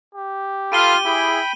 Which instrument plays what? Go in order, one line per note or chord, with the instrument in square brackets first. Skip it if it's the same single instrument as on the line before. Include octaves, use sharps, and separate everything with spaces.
[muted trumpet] G4
[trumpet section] F4 [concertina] A4 B5 [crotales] D7 D#7 G7
[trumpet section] E4 G#4 [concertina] G5 B5